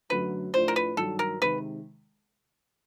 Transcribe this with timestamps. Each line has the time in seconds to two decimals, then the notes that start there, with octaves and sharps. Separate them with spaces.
0.10 F#2 D3 F#3 A3 B4
0.54 A2 F3 A3 D4 F4 C5
0.68 A#4
0.76 B4
0.97 G2 D#3 F#3 A4
1.19 A#4
1.41 C3 D#3 G#3 B4